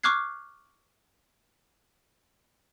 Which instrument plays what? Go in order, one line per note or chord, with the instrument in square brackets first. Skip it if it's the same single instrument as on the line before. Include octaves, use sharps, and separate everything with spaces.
[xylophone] C#6 D6 F6 F#6 G#6 C7